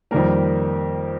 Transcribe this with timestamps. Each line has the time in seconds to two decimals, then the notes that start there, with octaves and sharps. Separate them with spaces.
0.11 F2 D#3 G3 A#3 A#4